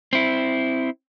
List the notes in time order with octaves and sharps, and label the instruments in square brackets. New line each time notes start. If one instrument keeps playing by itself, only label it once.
[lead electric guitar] C4 E4